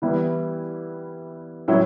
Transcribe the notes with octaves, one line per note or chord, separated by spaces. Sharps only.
E3 G3 B3 E4
A2 F#3 C#4 E4